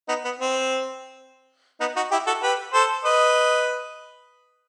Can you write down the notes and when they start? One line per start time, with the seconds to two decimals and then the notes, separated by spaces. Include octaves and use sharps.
0.09 B3 D#4
0.25 B3
0.40 C4
1.81 B3 D#4
1.96 D#4 F#4
2.11 E4 G4
2.27 F#4 A4
2.43 G4 B4
2.74 A4 C5
3.05 B4 D#5